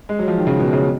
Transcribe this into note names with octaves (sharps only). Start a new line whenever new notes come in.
G#3
F#3
F3
D#3
C#3
B2
C#3